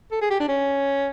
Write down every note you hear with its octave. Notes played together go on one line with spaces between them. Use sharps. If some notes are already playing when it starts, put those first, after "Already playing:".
A4
G#4
G4
D4
C#4